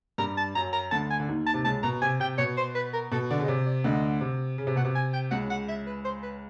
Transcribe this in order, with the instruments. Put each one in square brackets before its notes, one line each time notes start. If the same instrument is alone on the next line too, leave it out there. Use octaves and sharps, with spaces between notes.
[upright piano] G2 G3 [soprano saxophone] A#5
[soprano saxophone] A5
[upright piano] F#2 F#3 [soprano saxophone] A#5
[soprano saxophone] A#5
[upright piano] D2 D3 [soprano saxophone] A5
[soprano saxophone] G#5
[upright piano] D3
D#2 D#3
[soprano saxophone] A5
[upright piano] C3
[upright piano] C#2 C#3 [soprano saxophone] A5
[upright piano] B2 [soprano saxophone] A#5
[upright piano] C3 [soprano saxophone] G#5
[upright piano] C3 [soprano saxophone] G5
[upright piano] B2 [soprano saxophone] C#5
[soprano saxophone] C5
B4
A#4
[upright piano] B2 [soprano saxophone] A4
[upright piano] D3 [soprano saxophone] D5
[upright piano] C#3
[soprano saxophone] D#5
[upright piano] C3 [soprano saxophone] D5
[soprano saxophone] D5
[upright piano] D2 D3 [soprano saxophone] D#5
[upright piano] C3
C#3
C3
[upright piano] B2 [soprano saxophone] F#5
[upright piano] C3
[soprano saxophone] G#5
G5
[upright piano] C#2 C#3 [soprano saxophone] F#5
[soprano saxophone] F#5
E5
B4
C5
B4